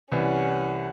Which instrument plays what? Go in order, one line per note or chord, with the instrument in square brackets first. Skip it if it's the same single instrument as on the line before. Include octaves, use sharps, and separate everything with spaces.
[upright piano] C2 E3 G3 [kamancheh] C#4 F#5